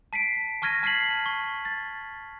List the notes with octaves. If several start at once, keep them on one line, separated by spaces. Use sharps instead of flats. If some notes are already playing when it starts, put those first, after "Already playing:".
A5 B6 C7 D7
A5 C#6 F6 G#6 A#6 D#7
A5 F6 B6 C7 F#7
C#6
A6